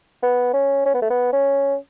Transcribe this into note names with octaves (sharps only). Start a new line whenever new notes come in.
B3
C#4
C#4
B3
A3
B3
C#4